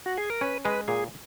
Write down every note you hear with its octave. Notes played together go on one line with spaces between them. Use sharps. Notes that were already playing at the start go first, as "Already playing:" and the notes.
F#4
G#4
A#4
C#4 B4
G#3 B4
A#2 G#4